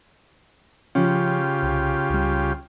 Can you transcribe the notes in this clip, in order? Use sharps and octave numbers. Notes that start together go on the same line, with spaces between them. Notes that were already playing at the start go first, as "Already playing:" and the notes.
C#3 F3 C#4 F4 G4
C2
C#2 G3